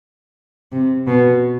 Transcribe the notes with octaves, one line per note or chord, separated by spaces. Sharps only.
C3
B2